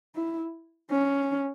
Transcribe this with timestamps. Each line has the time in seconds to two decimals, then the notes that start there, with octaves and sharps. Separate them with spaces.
0.16 E4
0.91 C#4